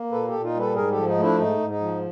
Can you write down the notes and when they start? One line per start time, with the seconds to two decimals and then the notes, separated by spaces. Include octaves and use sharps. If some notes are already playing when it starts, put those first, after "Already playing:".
Already playing: A#3
0.12 A#2 A4 B4
0.28 G4 A4
0.33 A#2
0.44 D#4 F4
0.54 G3
0.59 A4 B4
0.75 G#2 G#4 A#4
0.91 G4 A4
0.96 F3
1.07 D#4
1.17 A3
1.22 D4 E4
1.38 G#2 D#4
1.59 G#2
1.70 D#4
1.81 F3